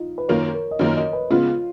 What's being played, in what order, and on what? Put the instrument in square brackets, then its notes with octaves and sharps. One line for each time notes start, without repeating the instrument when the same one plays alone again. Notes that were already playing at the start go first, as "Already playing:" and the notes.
Already playing: [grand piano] D#4 F4
B4
[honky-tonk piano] F#2 D#3 A#3 F4 A#4 [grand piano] C#5
[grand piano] A#4
D#5
[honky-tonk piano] F#2 D#3 A#3 F4 A#4 [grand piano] C#5
[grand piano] D#5
B4
[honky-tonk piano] C#3 G#3 B3 [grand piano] F4